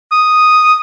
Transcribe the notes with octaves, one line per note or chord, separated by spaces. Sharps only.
D#6